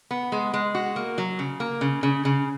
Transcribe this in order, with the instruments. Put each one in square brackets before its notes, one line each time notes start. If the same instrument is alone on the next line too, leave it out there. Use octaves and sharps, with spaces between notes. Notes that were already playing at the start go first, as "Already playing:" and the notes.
[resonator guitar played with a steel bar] B3
G#3
G#3
F#4
A#3
F#3
C#3
A#3
C#3
C#3
C#3